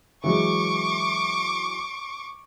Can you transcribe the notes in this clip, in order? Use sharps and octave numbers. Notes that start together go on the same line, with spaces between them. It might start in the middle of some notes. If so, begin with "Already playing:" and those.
E3 F#3 G#3 C#6 D6